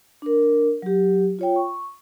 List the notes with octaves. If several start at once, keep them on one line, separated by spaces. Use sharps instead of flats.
D4 A#4
F#3 G4
F4 C#5 G5
C#6